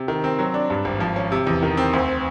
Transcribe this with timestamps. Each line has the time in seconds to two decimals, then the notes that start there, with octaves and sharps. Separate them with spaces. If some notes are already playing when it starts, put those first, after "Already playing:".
Already playing: C3
0.08 D#3
0.24 C4
0.39 F#3
0.54 D4
0.70 G2
0.85 G#1
1.00 F3
1.16 C#4
1.32 C3
1.47 E2
1.63 D#3
1.77 C4
1.93 D2